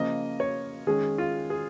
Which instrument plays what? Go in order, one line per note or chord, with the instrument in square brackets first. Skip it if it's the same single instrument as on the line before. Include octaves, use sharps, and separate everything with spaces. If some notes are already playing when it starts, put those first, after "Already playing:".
Already playing: [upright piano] C#3 F3 A#3 D#5
C#5
D#3 G#3 C#4 G#4
F4
G#4